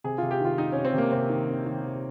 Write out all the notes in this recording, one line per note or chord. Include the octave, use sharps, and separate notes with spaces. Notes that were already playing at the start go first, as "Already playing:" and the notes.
C3 G#4
C3 F4
G4
D#3 F4
D#3 D#4
C3 C#4
C4
C3 A#3
C3 C4
D#3
C3
D#3
C3